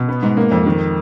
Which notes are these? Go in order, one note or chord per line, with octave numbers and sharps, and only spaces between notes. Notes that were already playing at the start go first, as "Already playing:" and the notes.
Already playing: B2
B3
G#2
A#3
F2
D#3